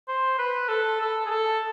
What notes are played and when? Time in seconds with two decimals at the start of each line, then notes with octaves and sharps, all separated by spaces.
0.08 C5
0.38 B4
0.69 A4
1.01 A4
1.26 G#4
1.31 A4